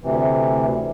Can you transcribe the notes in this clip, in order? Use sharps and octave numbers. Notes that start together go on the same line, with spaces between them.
D2 C3 E3